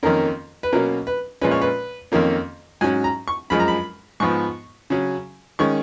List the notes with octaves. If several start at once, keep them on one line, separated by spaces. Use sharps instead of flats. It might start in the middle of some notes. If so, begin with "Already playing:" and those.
F2 D#3 A#3 C#4 A#4
B4
B2 F#3 A#3 C#4 A#4
B4
A#2 F3 G#3 C#4 B4
C#5
B4
F2 D#3 A#3 C#4
G#2 F#3 C#4 G#5
A#5
C#6
F#2 F3 G#3 B5
A#5
B5
G#2 F3 B3 C#6
C#3 F#3 C#4
D#3 G#3 C#4 C#6